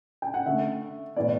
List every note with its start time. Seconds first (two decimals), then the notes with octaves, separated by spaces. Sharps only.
0.22 G5
0.34 F#5
0.46 D3 A3 E5
1.16 A2 E3 B3 D5